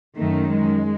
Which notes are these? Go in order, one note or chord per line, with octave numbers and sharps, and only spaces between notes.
F#2 D#3 A3
G#3